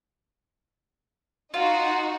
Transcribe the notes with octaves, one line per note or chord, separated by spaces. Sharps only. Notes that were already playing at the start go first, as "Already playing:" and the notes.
D#4 F4 F#4